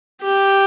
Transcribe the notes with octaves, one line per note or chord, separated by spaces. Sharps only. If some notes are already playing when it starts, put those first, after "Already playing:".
G4